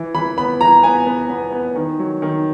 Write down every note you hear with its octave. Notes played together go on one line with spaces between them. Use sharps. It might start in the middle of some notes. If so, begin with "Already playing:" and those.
Already playing: E3
E3 B5
B3 B5
E3 A#5
B3 G#5
B3
B3
B3
D#3
F#3
D#3